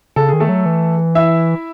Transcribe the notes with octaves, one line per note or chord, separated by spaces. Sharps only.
C#3 A4
D#3 G#4
A3 A4
F#3
E3
E4 E5